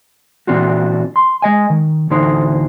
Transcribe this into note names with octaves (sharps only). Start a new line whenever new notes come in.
A#2 E3 C4 D4 F4 F#4
C6
G#3 D#5 G#5
D#3
D2 A2 D3 E3 D#4 C5